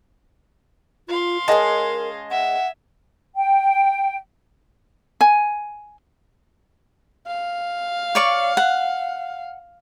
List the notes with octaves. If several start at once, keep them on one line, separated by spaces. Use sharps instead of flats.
F4 F5 C6
G#3 C#4 G#4 A#4 D#5 A5
E5 F#5
G5
G#5
F5
C#5 D5 C#6
F#5